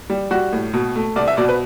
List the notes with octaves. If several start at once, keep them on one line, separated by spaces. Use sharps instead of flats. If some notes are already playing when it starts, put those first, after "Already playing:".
G3
G3 F#4
A2
B2
A3
C2 D5
E5
B2 D5
B4